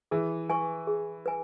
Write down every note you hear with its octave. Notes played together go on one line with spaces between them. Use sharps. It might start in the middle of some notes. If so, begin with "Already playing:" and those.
E3 G#4
B4 G#5 C#6
G#4
B4 G#5